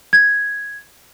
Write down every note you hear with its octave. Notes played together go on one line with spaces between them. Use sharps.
G#6